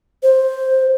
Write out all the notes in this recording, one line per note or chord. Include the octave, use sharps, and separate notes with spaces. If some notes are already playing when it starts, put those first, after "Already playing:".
C5